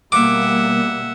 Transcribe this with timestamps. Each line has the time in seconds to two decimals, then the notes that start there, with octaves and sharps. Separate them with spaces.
0.12 B2 G3 A#3 E5 F#5 D6